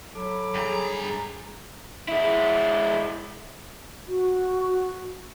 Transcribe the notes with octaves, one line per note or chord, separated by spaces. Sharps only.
F#3 A4 B5 D6
G2 G#4 A#5
G#3 E4
F#4